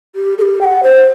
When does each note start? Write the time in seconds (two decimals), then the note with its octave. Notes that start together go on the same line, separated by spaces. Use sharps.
0.16 G4
0.38 A4
0.42 G4
0.61 G5
0.64 F#5
0.83 C5